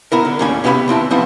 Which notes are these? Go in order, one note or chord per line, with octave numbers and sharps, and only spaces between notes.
B3 E4 A#4
D3
D#2 A2 C#4 D5 G#5
C3 B3 G4 F5 G#5 B5
D#2 C4 E4 A5
F3 B3 C4 E4